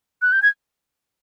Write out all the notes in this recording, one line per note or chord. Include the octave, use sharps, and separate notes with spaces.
F#6
G6
G#6